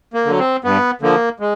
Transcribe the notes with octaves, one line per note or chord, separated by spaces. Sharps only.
A#3
D3 F#3
C4
G2 B3
D3 F3 A#3
G#3